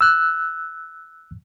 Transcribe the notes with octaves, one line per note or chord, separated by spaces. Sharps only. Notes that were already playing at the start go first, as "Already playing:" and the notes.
E6 F#6